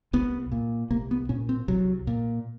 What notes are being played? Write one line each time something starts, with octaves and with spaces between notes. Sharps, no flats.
C2 B3
A#2
C2 A#3
B3
A#2 C#4
C4
C2 F#3
A#2